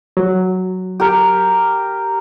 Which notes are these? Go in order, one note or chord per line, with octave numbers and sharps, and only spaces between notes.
F#3
G4 A#4